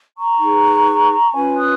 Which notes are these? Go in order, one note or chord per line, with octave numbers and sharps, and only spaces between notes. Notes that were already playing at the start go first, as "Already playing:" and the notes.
A#5 C#6
D#4 G#4 B4
C#4 F4 B4 G#5 B5
D#6 F#6